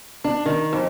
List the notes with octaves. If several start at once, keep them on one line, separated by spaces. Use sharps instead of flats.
D4
D#3
F2